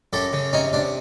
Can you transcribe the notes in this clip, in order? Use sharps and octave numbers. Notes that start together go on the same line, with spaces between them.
F#2 G4 A4
C#3
C3 C#4 D#4
C3 D4